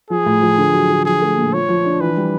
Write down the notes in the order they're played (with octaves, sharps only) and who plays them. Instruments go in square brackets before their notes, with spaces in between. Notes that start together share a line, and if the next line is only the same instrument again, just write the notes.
[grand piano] F3 [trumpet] G#4
[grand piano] A2
F3
D3
F#3
D3
[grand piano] F3 [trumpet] G#4
[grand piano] A3
A#2
[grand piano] F3 [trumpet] C#5
[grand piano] F3
D4
[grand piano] E3 [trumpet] B4
[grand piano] G3